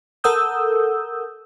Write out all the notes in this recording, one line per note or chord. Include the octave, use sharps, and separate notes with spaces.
A4 A#4 F#5 D#6 E6 G6